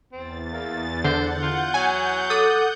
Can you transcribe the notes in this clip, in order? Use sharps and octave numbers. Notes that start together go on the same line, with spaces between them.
E2 C4 A6
A#3
D3 C5 F#5 G6
F4
F#3 G#5
A4 D6 D#6